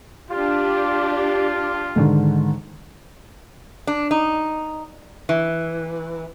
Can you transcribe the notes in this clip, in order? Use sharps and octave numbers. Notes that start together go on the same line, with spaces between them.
D4 F4 G4
G#2 D3 D#3
D4
D#4
E3